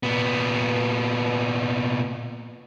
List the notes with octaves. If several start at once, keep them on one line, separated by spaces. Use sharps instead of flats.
A#2 B3